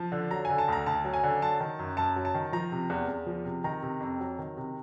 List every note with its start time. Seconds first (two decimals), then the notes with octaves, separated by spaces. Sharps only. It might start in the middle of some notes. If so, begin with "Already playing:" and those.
Already playing: F3 A5
0.12 D3
0.31 F#3 A#5
0.45 D3 G#5
0.58 A5
0.68 D2 A#5
0.86 D2 A5
1.05 F#3
1.14 G#5
1.24 D3
1.41 F#3 A5
1.60 D#3
1.79 F#2
1.97 F#2 A5
2.16 F#3
2.25 A5
2.34 D#3
2.52 F3 A#5
2.72 C3
2.90 E2
3.08 E2
3.26 F3
3.45 C3
3.64 D#3 A#5
3.83 C3
4.00 F2
4.19 F#3
4.39 D#3
4.57 C3